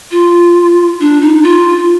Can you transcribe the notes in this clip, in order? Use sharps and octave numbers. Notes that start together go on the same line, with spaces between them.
F4
D4
D#4
F4